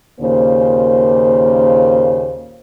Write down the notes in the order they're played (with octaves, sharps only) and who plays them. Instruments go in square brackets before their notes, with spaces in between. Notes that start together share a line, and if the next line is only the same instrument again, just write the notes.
[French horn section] D#2 A#2 C#3 A#3 C5